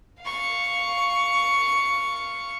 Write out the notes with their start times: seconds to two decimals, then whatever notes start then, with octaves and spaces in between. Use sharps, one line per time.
0.22 F5 C#6